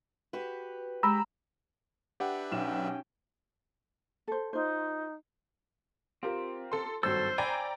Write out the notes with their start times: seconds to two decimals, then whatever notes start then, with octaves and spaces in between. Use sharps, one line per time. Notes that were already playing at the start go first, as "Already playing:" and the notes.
0.33 F#4 G4 B4
1.03 G#3 G4 A#5 B5 E6
2.20 D4 G4 B4 E5 F#5
2.52 B1 C#4 G5 E7
4.28 A4 C5
4.53 D#4 F4 C5
6.23 C4 F4 G4 A#4
6.72 A4 C6
7.03 G#1 G2 F#3 A4 C5 C#5 E6
7.38 D5 G5 G#5 A#5 B5